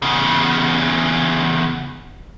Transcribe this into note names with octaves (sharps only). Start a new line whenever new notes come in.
E2 C#3